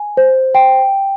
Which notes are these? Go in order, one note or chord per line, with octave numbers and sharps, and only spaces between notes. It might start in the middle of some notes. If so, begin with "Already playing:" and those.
Already playing: G#5
C5
G5